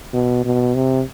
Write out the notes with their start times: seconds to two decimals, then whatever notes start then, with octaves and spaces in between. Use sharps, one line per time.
0.13 B2
0.44 B2
0.75 C3